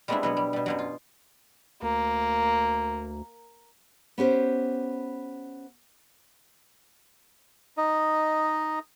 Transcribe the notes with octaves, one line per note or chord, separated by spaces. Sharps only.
G3 G#3 B3 C4 D4 E4
B2 F#3 B3
G3
B2 G3
F#2 B2 F#3
F4
D2 A#3
B3 C#4 G4 C5
D#4 D#5